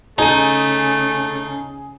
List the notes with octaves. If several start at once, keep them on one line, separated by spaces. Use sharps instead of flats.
C#3 A3 D#4 G#4 D#7